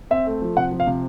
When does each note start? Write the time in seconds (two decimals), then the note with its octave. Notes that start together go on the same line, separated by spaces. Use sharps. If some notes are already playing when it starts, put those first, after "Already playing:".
0.11 C4 E5
0.27 A3
0.42 F3
0.57 C3 F#5
0.71 F3
0.80 F5
0.87 C3